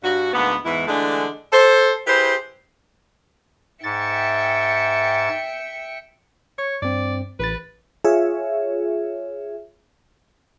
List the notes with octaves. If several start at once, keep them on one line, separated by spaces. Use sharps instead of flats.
G2 F#4
D2 G#2 A#3 B3
E2 G#2 E3 E4
D3 E3 G#3 A3 D4
A4 C5
E4 G4 G#4 B4 C5
G#2 E5 G5 A6 C#7
C#5 C#6
G2 C4 D5
A1 B4 B5 A6
F4 G#4 C#5 E5